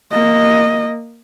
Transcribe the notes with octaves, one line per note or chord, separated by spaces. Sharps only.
A#3 D#5